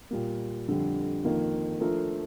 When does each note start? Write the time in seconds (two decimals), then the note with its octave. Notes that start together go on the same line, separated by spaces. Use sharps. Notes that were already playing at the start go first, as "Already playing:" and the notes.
0.11 A#2 G3 A#3
0.68 F2 D3 G3
1.24 F2 D#3 A#3 F4
1.80 F3 A3 D4 F4 A#4